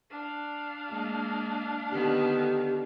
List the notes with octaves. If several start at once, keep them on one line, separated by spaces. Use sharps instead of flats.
D4 F5
G#3 A#3
D3 D#3 B3 G4